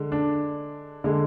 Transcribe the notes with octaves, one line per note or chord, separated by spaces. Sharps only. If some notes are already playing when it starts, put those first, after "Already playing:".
Already playing: D3 G#3
D4
D3 G#3